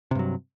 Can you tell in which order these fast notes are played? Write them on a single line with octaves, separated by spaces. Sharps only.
C3 G2 F#3